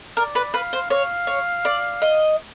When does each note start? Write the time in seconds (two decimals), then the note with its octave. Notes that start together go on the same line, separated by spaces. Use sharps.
0.17 A#4 D5
0.35 B4
0.54 B4 F5
0.73 C5
0.90 C#5 F5
1.27 C#5
1.65 D5
2.02 D#5